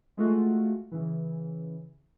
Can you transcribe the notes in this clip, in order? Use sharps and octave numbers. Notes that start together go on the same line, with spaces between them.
G#3 A3 F4 F#4
C#3 E3